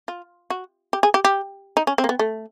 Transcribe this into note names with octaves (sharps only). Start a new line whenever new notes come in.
F4
F#4
G4
G#4
G4
G4
D#4
C#4
C4
A#3
B3
A3